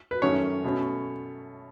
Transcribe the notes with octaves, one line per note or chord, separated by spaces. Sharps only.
B4
F#2 D#3 A3 C#4 C#5
B2 A3 C#4